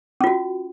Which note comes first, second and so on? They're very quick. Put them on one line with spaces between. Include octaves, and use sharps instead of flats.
C#4 F4 F#4